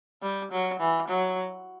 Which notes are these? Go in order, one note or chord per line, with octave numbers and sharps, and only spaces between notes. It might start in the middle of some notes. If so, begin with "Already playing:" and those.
G3
F#3
E3
F#3